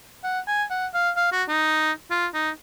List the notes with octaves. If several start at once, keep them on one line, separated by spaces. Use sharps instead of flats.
F#5
G#5
F#5
F5
F5
F#4
D#4
F4
D#4